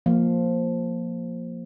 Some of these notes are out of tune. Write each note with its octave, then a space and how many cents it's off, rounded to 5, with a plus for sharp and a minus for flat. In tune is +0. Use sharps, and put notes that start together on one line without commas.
F3 +5 A#3 +0 F5 +0